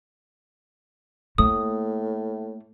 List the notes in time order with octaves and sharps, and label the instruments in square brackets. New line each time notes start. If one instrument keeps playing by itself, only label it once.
[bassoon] A2 [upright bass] A3 A#3 [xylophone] D#6